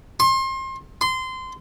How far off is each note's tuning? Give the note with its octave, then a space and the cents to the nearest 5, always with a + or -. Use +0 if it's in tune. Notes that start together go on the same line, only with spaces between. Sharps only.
C6 +30
C6 -20